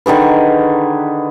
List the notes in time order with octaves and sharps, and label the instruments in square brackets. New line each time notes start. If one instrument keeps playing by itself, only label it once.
[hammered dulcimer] D3 D#3 G#4 B4